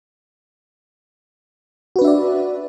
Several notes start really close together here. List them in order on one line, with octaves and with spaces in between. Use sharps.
F#4 B4 D4 E5 D5